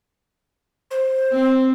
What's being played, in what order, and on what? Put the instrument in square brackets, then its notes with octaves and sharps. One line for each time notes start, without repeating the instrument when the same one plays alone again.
[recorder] C5
[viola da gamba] C4